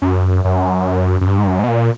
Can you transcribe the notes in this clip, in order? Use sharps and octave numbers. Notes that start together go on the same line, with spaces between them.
F#2
F#2
F#2
G2
G#2
G2
F#2
G#2
B2
A#2